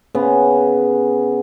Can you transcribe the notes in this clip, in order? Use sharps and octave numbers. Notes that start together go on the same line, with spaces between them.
C#3 B3